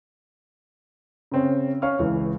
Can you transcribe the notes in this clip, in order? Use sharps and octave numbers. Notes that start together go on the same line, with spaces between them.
C#3 C4 C#4
C#4 F5 C#6 F6
C#2 E3